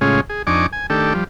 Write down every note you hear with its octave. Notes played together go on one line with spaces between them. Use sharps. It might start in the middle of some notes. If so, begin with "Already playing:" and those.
A2 C#3 G#3 C#4 F4 G#4
G#4
F2 D4 D#4 G#5 C#6 D6
G#5
D#3 A3 D4 G4 A4
F3 G3